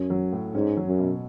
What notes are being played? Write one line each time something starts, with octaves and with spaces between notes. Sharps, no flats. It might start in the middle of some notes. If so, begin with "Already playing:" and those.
Already playing: F#2 C#4
F#3
A2
G#2 C#4
F#3
F#2
B2